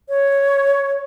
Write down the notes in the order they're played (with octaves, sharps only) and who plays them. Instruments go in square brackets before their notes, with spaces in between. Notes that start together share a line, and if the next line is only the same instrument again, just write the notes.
[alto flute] C#5